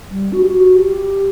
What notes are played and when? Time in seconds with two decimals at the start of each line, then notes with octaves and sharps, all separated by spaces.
0.11 G3
0.32 F#4
0.41 G4
0.50 F#4
0.76 G4